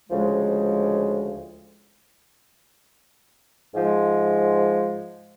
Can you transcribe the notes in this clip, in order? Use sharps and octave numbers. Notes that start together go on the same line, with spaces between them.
D2 C#3 F3 G#3
G#2 F3 G#3